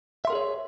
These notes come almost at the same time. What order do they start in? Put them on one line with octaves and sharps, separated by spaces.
E5 C6 A#4 G#4 C#5